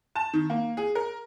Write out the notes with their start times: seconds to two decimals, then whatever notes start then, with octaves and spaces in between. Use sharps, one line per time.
0.16 A5
0.33 D#3
0.50 A#3
0.77 G#4
0.95 A#4